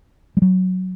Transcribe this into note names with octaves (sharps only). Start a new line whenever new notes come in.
G3
F#3